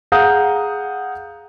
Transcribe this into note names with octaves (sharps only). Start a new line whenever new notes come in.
G#4 F5 F#5 A#5 D#6 G6